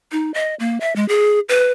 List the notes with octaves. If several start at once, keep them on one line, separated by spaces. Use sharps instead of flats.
D#4
D#5
A#3
E5
G#3
G#4
B4